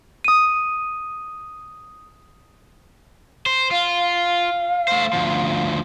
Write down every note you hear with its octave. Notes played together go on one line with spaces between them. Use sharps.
D#6 D#7
C5
F4 F5
A3 C5
D2 F3